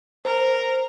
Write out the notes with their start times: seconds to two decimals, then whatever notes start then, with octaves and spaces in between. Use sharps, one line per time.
0.25 A#4 C5